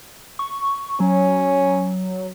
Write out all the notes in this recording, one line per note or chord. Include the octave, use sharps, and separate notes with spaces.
C#6
F#3 C#4